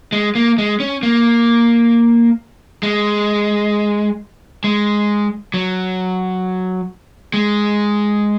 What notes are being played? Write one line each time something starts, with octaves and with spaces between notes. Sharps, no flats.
G#3
A#3
G#3
C#4
A#3
G#3
G#3
F#3
G#3